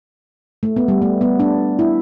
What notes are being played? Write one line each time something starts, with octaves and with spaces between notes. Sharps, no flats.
A3
B3
G3
A3
B3
D4
E4